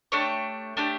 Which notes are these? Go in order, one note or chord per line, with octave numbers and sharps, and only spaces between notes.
A3 D4 G4 C#5
A3 D4 G4